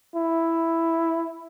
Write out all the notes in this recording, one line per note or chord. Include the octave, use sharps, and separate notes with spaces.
E4